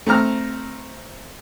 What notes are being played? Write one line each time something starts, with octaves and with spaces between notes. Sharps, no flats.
A3 C4 A#5 F6